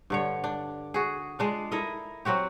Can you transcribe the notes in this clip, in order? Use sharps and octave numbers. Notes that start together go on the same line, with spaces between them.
G2 D3 C#5
D4
F#4 G#4
G#3 D4 F4
E4 A4 A#4 D#5
F#3 C4 F#4 G4